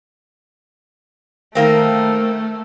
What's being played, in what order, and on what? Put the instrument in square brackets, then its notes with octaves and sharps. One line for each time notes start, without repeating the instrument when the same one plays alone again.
[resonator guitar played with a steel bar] D#3 A#3 C4 [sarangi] A3